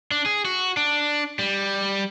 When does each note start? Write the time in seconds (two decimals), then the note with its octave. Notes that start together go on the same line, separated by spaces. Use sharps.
0.11 D4
0.26 G#4
0.45 F#4
0.77 D4
1.39 G3